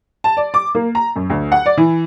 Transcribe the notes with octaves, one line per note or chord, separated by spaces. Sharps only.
A5
D5
D6
A#3
A#5
F#2
D2
F#5
D5
E3